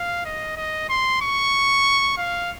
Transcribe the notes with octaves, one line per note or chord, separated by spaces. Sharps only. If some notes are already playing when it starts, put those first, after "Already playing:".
Already playing: F5
D#5
D#5
C6
C#6
F5